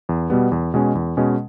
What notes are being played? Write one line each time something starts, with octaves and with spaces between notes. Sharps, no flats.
E2
B2 G3 B3
E2
B2 G#3 C#4
E2
B2 G#3 C#4